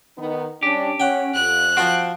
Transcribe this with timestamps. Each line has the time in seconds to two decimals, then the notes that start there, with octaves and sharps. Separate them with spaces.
0.17 D#3 B3 D#4
0.63 G3 C#4 D4 G4
1.00 C#4 F#5 G5
1.34 F2 F#6
1.77 F3 C4 F4 F#4